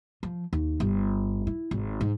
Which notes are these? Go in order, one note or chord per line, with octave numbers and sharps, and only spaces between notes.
F3
D#2
G1
E4
G#1
G#2